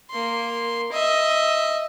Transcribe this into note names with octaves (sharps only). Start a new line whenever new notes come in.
A#3 C6
D#5 E5